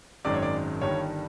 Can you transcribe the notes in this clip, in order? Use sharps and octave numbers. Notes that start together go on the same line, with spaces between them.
G#1 F#2 D#3 G#3 D5
C#5
D5
G1 G2 D#3 G3 C#5